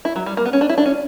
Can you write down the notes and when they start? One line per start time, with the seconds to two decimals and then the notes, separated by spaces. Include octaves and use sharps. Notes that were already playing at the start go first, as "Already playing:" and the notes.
0.05 E4
0.16 F#3
0.26 G3
0.37 A#3
0.45 B3
0.53 C#4
0.61 D4
0.69 E4
0.78 D4
0.86 C#4